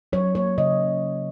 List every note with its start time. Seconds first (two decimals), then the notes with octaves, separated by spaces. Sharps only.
0.13 F#3 C#5
0.35 A#3 C#5
0.58 C#3 D#5